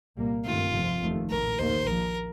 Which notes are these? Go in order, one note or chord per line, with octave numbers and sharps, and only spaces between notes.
C2 A#2 G3 A#3
G2 D#3 A3 C4 F4
F1 F2 C3 F3 C4
F1 D#2 D#3 A3
A#1 A2 A3 A#4
D#2 D#3 A#3 C5
A#1 A#2 F3 A#4